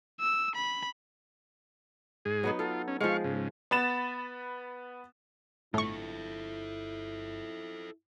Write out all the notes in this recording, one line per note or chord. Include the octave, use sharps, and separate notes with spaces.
E6
B5
G#2 G#4
F#3 B3 D#4
F4 A4
C#4
F3 G#3 F5 C#6
G#2 C#3
B3 B5 A6 E7
G1 A2 E4 F4 A4 C#6